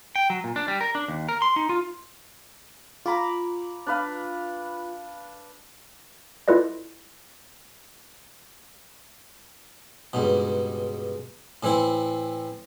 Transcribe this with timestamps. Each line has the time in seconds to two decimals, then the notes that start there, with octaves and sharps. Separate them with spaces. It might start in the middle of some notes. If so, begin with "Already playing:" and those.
0.16 G5
0.30 F#3
0.44 A#2
0.56 D4
0.68 G3
0.81 A#4
0.95 D4
1.08 D#2
1.29 A#4
1.42 C6
1.56 D#4
1.69 F4
3.06 F4 A#5 B5 D6
3.87 D4 B4 F5
6.48 E4 F4 A4 B4 D5 D#5
10.13 C#2 G2 B2
11.63 A2 E3 C4 E4